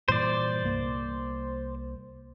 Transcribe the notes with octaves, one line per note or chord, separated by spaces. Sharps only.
G2 A#2 E3 C5 D5
C2 A#3